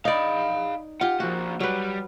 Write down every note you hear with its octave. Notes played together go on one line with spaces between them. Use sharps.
D#4 D5 F5 B5
F4 G4 F#5
F3 A#3 F#4
F#3 G3 B4